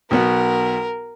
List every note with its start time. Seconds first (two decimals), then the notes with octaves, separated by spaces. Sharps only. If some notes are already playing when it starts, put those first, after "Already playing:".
0.11 B1 B3 F#4 A#4